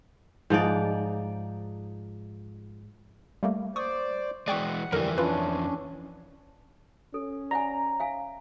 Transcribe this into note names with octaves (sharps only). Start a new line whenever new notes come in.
G#2 F3 D#4 D5
G3 A3 A#3
C5 D5 C#6 D#6
E3 G#3 D5 F#5 G5 C#6
F2 D3 E3 G3 A#4 A#5
C#4 D4 F4 B4
C#4 A4
D5 F#5 G#5 A#5
E5 F5 G#5